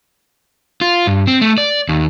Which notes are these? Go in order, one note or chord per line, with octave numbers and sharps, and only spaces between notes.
F4
G2
C4
A3
D5
D#2